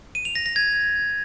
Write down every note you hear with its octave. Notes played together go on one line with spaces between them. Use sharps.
D#7
F7
A#6
A#6
G#6